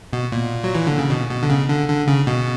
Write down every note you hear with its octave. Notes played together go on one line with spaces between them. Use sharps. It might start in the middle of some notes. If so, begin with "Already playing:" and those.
B2
A#2
F#3
E3
D3
C#3
B2
B2
D3
C#3
D3
D3
C#3
B2